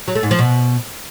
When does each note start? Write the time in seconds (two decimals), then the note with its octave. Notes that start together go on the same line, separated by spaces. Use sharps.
0.08 F#3
0.15 A3
0.23 G#2
0.31 F3
0.39 B2